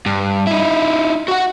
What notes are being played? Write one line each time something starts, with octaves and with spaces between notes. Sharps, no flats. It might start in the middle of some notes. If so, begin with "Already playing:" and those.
G2
D#4 E4
F#4 F#5